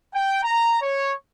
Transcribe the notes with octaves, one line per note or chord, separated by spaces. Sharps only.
G5
A#5
C#5